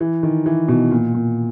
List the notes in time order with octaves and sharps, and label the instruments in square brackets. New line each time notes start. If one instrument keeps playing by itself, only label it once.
[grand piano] E3
D#3
E3
B2
A#2
A#2